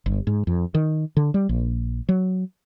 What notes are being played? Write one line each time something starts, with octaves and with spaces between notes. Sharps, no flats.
G1
G#2
F2
D#3
D3
G3
A#1
F#3